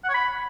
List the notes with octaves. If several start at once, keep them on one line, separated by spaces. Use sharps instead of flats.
F#5
C#5
B5